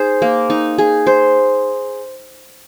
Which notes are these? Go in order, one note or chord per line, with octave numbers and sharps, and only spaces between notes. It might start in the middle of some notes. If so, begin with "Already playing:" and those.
Already playing: D#4 G#4 C5
A#3
D#4
G#4
C5